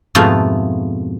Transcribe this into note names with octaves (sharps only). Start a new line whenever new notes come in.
F2 G#2 B2 A3 E4 F4